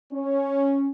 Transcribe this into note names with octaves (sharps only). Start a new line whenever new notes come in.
C#4